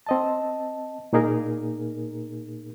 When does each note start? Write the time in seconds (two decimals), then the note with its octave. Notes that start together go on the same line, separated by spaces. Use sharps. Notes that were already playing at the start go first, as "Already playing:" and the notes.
0.06 C4 D#5 A5
1.13 A#2 A#3 D#4 G#4 A#4